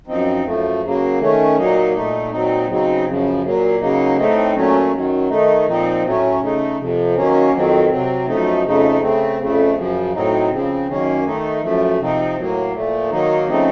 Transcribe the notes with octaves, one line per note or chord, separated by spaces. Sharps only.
F#2 F3 C4 D#4
F#2 F3 A3
C#3 F#3 A#3
D#3 A3 C#4
A#2 F#3 A#3 D#4
A#2 A3 D#4
A#2 F#3 C4 D#4
C#3 F#3 C4 D#4
F#2 C#3 F3
A#2 F#3 A#3
C#3 F#3 A#3 D#4
A2 A3 C4 D#4
A#2 F#3 A3 C#4
F#2 D#3 F#3
D#3 A3 D#4
A#2 F3 C4 D#4
A2 F#3 A3 C#4
C#3 A3 D#4
F2 C3 F3
D#3 F#3 A#3 C#4
F2 D#3 F#3 C4
C3 F#3 C4
F#2 F3 A3 D#4
F2 C#3 A3 D#4
C#3 A3 C4
F2 C#3 A3
F#2 C#3 F3
A2 F#3 C4 D#4
C#3 F3 C4
F#2 D#3 A#3 C#4
D#3 A3 D#4
F#2 F3 A3
C3 F3 C4 D#4
A2 F#3 A#3
A#2 F3 A3
D#3 F#3 A#3 D#4
C#3 F3 A3 C4 D#4